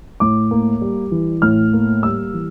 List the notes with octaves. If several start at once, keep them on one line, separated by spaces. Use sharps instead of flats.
A2 D6
A#3
G3
E3
A2 F6
A#3
G3 E6
E3